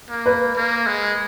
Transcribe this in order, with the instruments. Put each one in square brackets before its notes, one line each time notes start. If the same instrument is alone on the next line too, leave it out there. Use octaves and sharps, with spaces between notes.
[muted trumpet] A#3
[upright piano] B4
[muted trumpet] A#3
G#3